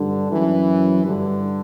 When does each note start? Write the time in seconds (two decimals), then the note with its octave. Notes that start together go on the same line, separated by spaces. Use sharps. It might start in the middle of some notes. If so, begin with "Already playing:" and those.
Already playing: G2 D3
0.31 F#2 E3
1.04 G2 D3